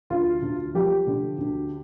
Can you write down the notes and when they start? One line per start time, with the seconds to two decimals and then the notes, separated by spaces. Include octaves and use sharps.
0.10 D2 F4
0.42 D2
0.74 F3 G4
1.07 D3
1.38 D2